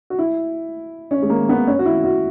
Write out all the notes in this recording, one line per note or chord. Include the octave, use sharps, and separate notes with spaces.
F#4
E4
C#4
G#3
A#3
B3
C#4
F#4
E4
F#4